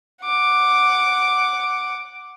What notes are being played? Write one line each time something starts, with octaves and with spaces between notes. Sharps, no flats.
F#5 D6